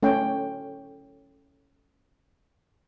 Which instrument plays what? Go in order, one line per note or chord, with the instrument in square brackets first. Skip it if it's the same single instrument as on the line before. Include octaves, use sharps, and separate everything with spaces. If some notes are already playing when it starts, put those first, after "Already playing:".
[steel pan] A3 C#4 C#5 G5